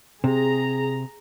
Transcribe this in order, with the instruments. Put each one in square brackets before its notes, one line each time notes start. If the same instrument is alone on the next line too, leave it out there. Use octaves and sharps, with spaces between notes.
[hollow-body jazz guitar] C3 [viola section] G#4 A#5